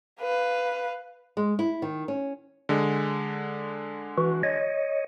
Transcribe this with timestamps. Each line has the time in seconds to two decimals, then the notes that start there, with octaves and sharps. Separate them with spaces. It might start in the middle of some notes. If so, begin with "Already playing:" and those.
0.21 B4 F5
1.37 G#3
1.59 E4
1.82 D#3
2.08 C#4
2.69 D3 G#3
4.18 E3 F#4
4.43 C#5 D#5